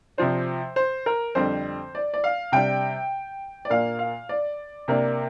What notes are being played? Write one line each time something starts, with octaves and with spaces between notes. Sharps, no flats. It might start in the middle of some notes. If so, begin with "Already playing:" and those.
C3 F3 D4 C5
C5
A#4
F2 D3 G3 C4 C5
D5
D5
F5
C3 G3 D4 G5
D5
A#2 A#3 D4 F5
F5
D5
C3 A#3 D4